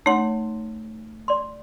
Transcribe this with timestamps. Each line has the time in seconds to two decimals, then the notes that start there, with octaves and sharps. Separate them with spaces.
0.06 A3 D#4 C#5 F#5 C6
1.28 D5 C6